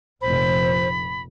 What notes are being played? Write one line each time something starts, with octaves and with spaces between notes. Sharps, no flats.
F1 A#1 C5 B5